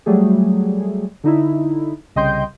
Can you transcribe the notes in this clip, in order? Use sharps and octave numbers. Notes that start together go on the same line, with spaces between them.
F#3 G3 A3 G#4
D3 D#4 E4
C2 C#3 D#5 G5 C6 G6